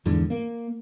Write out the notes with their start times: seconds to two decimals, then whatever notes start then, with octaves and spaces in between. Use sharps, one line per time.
0.06 E2 G#2 D3 E3
0.30 A#3